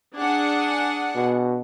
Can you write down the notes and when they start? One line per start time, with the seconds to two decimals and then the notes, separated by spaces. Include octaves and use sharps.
0.17 D4 G#4 F#5
1.15 B2